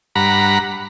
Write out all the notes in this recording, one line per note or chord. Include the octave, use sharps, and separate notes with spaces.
G2 F#5 A#5 B5